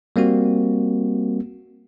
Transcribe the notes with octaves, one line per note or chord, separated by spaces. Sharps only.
G3 A#3 C4 F#4